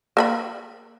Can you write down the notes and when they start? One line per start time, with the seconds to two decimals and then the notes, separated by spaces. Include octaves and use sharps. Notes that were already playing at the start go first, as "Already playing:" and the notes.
0.17 A#3 A#4 B5